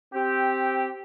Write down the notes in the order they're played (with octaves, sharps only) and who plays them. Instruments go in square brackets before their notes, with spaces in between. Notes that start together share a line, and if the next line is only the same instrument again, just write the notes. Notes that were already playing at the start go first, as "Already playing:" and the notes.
[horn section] C4 G4